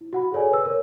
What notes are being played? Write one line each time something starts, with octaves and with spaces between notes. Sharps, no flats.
E4
F#4 F#5 B5
G#4 A4 C#5 D5 G#5
B4 E6
A#4 C#5